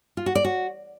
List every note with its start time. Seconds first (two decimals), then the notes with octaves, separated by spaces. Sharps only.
0.17 F4
0.26 F#4
0.35 D5
0.44 F#4